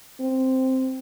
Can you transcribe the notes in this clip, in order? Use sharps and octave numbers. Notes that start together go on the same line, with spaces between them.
C4